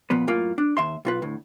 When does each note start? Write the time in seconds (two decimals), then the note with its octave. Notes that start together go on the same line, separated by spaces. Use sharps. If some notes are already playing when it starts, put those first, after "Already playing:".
0.10 A#2 F3 B3 B4
0.27 F#2 A2 A#3 F4
0.58 D4
0.77 D#2 E5 C6
1.05 B1 F4 B4
1.22 D2 A2